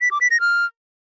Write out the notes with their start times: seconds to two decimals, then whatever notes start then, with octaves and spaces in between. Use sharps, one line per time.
0.01 B6
0.11 D6
0.21 B6
0.31 A#6
0.41 F6